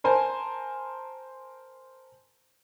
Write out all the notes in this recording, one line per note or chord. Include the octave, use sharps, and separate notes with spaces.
A#4 C5 G#5 A5